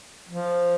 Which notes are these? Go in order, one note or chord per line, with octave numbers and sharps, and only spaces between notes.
F3